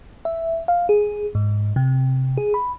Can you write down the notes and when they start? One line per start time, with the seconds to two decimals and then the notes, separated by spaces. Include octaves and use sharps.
0.25 E5
0.68 F5
0.89 G#4
1.35 G#2
1.76 C3
2.37 G#4
2.54 B5